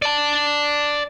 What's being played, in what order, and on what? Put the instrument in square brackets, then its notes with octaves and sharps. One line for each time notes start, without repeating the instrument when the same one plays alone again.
[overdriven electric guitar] D5 A5